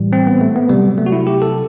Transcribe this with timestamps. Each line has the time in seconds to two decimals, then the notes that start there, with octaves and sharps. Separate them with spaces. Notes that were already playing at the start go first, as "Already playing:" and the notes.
Already playing: A2 E3 G3
0.13 C4
0.27 B3
0.41 A3
0.56 B3
0.69 C3 F#3 G3
0.98 A3
1.06 F#4
1.12 E4
1.27 G4
1.42 A4